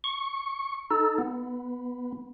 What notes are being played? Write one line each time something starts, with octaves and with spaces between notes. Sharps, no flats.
C#6
D#4 A4
B3